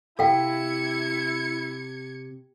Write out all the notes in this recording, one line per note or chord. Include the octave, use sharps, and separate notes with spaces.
C3 E4 A4 F5 G5 G#6 C#7